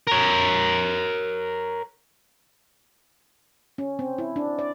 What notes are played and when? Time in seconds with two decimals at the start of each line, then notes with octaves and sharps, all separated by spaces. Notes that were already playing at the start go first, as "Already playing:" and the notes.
0.07 A#4 C#5
3.78 C#4
3.99 C4
4.18 E4
4.36 D4
4.59 D5